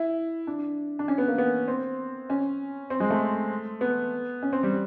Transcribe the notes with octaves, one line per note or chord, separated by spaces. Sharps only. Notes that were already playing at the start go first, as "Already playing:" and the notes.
Already playing: E4
D4
D4
C#4
B3
A#3
B3
C4
C#4
C4
G#3
A3
B3
C#4
C4
G3